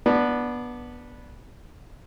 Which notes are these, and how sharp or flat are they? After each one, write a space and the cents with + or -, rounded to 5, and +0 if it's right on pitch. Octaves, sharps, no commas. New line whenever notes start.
B3 -15 D4 +0